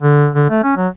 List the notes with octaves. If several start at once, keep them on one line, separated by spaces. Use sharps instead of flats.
D3
D3
A3
C#4
F#3